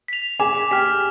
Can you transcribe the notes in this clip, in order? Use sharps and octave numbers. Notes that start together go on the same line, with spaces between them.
B6 F7
G#4 G#5 D6
G4 G5 F6 B6